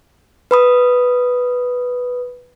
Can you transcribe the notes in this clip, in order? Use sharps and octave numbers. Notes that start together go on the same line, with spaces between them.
B4 B5 D#6